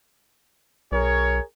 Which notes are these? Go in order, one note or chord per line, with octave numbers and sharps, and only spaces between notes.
B1 G#4 A#4 C#5